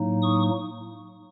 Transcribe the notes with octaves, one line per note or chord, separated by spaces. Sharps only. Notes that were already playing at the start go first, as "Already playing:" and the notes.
Already playing: A2 F#3 A#3 D#4
C#6 D#6